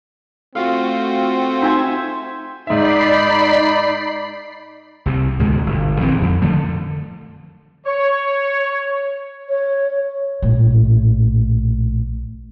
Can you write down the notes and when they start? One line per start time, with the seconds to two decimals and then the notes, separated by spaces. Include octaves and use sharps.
0.55 A3 C4 F4 F#4 F5
1.62 D#4 C5 E5 G#5
2.67 G#2 D#4 D5 E5 B5 C7
5.06 C2 C3
5.39 D2 G#2 B2 G#3
5.66 G1
6.00 A#1 D#3 E3 C4
6.22 F2
6.42 D3 F3 A3
7.86 C#5
9.49 C#5
10.42 A#1 A2